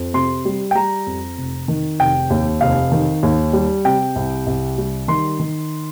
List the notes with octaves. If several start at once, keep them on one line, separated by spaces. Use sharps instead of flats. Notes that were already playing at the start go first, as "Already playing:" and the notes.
Already playing: F2
C3 C6
G3
G5
G3 A#5
F2
F1
D#3
F1 G5
D#2
F1 F5
D#3
D#2
G3
C3 G5
C2
C2
G3
D#3 C6
D#3